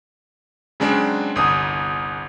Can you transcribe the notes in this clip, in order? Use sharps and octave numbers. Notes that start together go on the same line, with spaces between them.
C#3 F#3 G#3 C4 D4
G1 C2 D#6